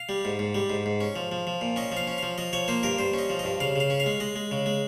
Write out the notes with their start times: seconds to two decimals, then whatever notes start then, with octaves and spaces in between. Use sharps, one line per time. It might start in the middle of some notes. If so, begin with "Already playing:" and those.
Already playing: F5
0.09 G3
0.25 G#2
0.39 G#2
0.55 G3
0.70 G#2
0.86 G#2
1.01 C#4
1.16 F3
1.32 F3
1.47 F3
1.61 A#2
1.76 C#4 D#5
1.92 F3 F5
2.07 C#4
2.18 F3 F5
2.38 F3 D#5
2.53 F3 C#5
2.68 A#3 C5
2.83 G2 A#4
2.98 G2 C5
3.13 C#4
3.19 D#5
3.30 F3
3.39 G2 D#5
3.60 C#3 F5
3.76 C#3 F5
3.90 C#4
4.00 F5
4.06 G#3
4.20 G#3 D#5
4.36 G#3
4.51 C#3
4.66 G#3